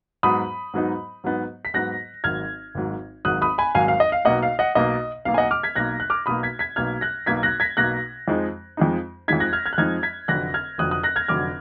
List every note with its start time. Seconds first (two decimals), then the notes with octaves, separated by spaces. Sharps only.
0.23 G#2 F#3 B3 D#4 B5 D#6
0.74 G#2 F#3 B3 D#4
1.24 G#2 F#3 B3 D#4
1.65 B6
1.74 G#2 F#3 B3 D#4 F#6 A#6
2.24 G#1 G#2 F#3 F6 G#6
2.75 G#1 G#2 F#3
3.25 G#1 G#2 F#3 D#6 F#6
3.42 B5 D#6
3.58 G#5 B5
3.75 G#1 G#2 F#3 F5 G#5
3.88 F5
4.00 D#5
4.12 F5
4.25 B1 B2 A#3 D#5 F#5
4.43 F5
4.59 D#5 F#5
4.75 B1 B2 A#3 D#5
5.25 B1 B2 A#3 F5
5.34 G#5
5.38 D#5 F#5
5.51 D6 F6
5.63 G#6 B6
5.76 B1 B2 A#3 F#6 A#6
6.00 F#6
6.10 D6 F6
6.26 B1 B2 A#3 B5 D#6
6.43 G#6 B6
6.59 G#6 B6
6.76 B1 B2 A#3 F6 G#6
7.01 F#6 A#6
7.26 B1 B2 A#3 G#6 B6
7.43 F#6 A#6
7.60 G#6 B6
7.77 B1 B2 A#3 F#6 A#6
8.28 F2 F3 G#3 D#4
8.77 F2 F3 G#3 D#4
9.28 F2 F3 G#3 D#4 G#6 B6
9.40 F#6 A#6
9.53 F6 G#6
9.66 F6 G#6
9.73 F#6
9.78 F2 F3 G#3 D#4 F6 G#6
10.03 G#6 B6
10.28 F1 F2 D3 F#3 F#6 A#6
10.54 F6 G#6
10.78 F1 F2 D3 F#3 D#6 F#6
10.91 D#6 F#6
11.03 F#6 A#6
11.16 F6 G#6
11.28 F1 F2 D3 F#3 D6 F6